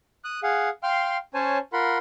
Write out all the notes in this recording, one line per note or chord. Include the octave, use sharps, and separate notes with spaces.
D#6 F#6
G#4 F5 F#5
F5 G5 C6 F6
C#4 C5 C#5 G#5 A5
F4 A#4 F#5 B5 C6